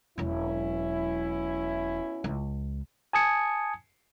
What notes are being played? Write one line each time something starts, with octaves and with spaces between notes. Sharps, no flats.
E1 B2 F#3 C#4 E4
C#2
G#5 A5 D#6 G#6 C#7